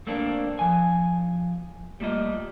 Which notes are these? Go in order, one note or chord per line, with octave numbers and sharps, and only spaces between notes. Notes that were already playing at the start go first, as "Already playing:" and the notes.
A3 A#3 C4 D4
F3 G#5
G3 A3 A#3 F4 D#5